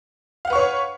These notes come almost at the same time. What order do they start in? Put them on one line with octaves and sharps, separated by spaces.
F5 F#5 B4 C#6 C#5